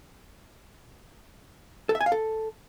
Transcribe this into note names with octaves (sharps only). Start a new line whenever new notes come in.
A4
E5
G#5
F5
A4